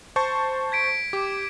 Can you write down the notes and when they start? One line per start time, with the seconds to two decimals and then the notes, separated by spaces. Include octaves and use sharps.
0.16 C5 A5 C#6
0.72 G#6 B6 D7
1.13 G4 D6